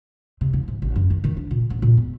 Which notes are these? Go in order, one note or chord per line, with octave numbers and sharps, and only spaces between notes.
C3
E3
G#2
A1
F#2
D#3
D#3
D4
A#2
A1
A#2
E2